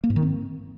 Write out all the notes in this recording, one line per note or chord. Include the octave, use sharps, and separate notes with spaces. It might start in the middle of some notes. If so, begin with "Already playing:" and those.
A#3
G#2
D#3
C4